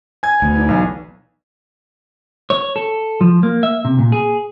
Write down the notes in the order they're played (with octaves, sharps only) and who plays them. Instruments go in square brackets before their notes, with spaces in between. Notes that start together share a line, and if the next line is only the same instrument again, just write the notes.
[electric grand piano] G#5 G#6
[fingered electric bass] D2 [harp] B3
[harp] D4 D#4
[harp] E1 F5 G#5 [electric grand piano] B1
[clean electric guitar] C#5
A4
F3
A#3
E5
C3
A#2
G#4